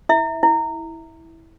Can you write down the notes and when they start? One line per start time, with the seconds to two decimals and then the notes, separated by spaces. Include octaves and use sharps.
0.09 E4 E5
0.43 E4